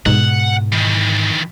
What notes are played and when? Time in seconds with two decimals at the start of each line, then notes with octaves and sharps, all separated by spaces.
0.06 G#2 B2 F#5
0.72 D#3 E3